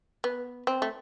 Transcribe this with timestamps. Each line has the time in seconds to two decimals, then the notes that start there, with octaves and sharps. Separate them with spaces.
0.24 B3
0.67 C4
0.82 A3